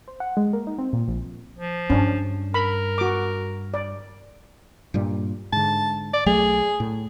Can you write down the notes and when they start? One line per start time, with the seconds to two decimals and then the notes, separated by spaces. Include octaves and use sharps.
0.08 C5
0.20 F#5
0.37 G#3
0.53 A#3
0.67 D#4
0.78 C4
0.93 A#2
1.08 A#1
1.56 F3
1.90 G2 C#4 D4
2.54 A#4 B5
2.98 F#4 D6
3.74 D5
4.94 G2 A#2 G3
5.53 G#2 D3 A5
6.13 D5
6.26 B1 F#3 A3 G#4
6.80 A2